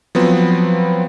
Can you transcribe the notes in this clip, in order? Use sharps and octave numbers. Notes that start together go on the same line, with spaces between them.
F3 F#3 B3 C4